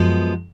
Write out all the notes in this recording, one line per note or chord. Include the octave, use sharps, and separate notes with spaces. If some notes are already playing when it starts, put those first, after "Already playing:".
Already playing: F#2 F3 G#3 B3